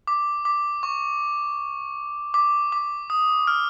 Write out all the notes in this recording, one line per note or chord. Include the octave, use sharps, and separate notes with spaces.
D6
D6
C#6
D6
D6
D#6
F6